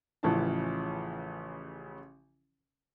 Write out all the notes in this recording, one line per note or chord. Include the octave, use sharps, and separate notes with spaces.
A1 C#3 E3 F3 A5